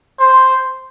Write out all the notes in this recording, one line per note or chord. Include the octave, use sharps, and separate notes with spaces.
C5